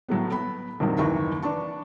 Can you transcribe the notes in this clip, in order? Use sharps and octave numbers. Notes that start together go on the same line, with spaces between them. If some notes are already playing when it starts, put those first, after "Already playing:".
A2 F#3 A3 B3
B3 B5
A#1 F2 A#2 D#3 F3 F#3
F#1 D#2 E3 A#4 C#6
D4 B4 A5 C#6